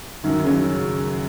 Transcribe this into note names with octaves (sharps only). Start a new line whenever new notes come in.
F#2 D#3
C#3 F#3 C#4